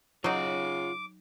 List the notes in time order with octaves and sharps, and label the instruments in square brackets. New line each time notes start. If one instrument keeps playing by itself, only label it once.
[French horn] C#3 [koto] F#3 D#4 [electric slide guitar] F4 F#5 [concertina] D6